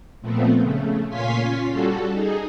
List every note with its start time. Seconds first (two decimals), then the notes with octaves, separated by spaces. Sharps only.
0.21 A#2 F3 A3 B3 C4
0.61 C#3 A3
1.09 A#2 C#5 F5 G#5 C6 B6
1.40 C#4 F4
1.70 G3 F#4 A4
2.11 D#4 G#4